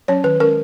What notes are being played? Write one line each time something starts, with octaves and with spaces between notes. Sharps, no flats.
F#3 C#4 C#5
D#3 B4
G#3 C#4 A#4